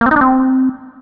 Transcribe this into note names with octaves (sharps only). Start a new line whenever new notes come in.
A#3
C4
D#4
D4
C4